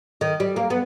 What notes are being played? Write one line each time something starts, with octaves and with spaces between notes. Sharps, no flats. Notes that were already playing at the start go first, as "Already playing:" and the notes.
D#3
G3
A#3
B3